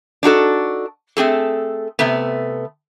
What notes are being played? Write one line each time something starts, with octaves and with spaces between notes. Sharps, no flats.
D4 D#4 F#4 A4
A3 C4 G#4 A4
C3 A3 B3